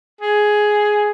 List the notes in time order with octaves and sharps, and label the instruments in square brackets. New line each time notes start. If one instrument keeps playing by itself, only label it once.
[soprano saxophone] G#4